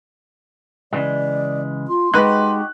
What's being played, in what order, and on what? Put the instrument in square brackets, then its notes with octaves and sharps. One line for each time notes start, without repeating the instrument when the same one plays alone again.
[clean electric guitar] C#3 E3 G#3 [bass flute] D5
[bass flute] F4 [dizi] C6
[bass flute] G#3 [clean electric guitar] D#4 F#4 G4 [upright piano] B4 F#6